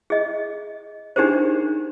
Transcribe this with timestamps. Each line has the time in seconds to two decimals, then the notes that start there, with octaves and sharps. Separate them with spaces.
0.10 G#4 D#5
1.16 D4 D#4 G4 G#4 A#4 C5